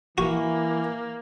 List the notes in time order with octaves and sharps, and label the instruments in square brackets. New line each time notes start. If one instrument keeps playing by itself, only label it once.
[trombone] E3 [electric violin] A#3 [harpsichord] F#4